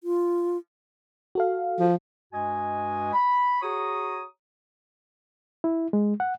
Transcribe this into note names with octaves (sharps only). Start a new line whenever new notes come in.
F4
F#4 A4 F5
F3
G2 G#3 F#4 D#5 G#5
B5
F#4 G#4 C#5 A#5 C#6 D#6
E4
G#3
F#5